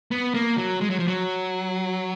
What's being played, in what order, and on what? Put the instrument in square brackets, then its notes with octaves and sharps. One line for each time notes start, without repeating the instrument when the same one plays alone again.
[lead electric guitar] B3
A#3
F#3
G#3
F#3
F3
F#3